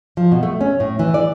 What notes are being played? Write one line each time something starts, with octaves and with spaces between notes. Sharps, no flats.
F3
B2
A3
C#4
A2
E3
D5